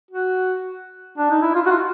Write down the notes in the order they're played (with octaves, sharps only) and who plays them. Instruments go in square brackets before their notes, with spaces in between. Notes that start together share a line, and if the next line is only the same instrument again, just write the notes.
[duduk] F#4
D4
D#4
E4
F4
F#4
F4